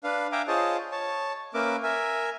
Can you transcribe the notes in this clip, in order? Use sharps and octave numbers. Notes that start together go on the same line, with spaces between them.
D4 B4 F5
E5 F5 G5 G#5 A#5 D6
F4 G#4 C5 C#5 D#5 A5
C#5 A5
A#3 C#4 A#4 B4 E5 D6
A#4 E5 G#5